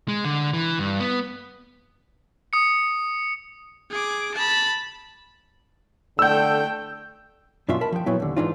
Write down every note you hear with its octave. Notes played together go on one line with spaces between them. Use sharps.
G#3
D3
E3
G2
B3
D#6 C#7
G#4 D6
A5 B5
D3 A3 G5 E6 G6
F#2 B2 D4 F4 E5 C6
A#4 A5 B5
F3 G5
A#2 F#3 B3 E4
D#2 D3
G#2 E3 G#3 D4 D#4 F4